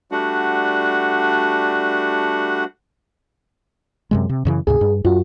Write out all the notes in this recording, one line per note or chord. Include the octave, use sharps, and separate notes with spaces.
G3 A3 D4 F#4 F#5
F#2 C3 G#3
C3
F#2 C#3 E3
D2 G#2 C3 G#4
G2
F#2 F4 F#4